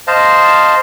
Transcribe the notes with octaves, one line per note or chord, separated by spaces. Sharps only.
C5 D#5 F5 A5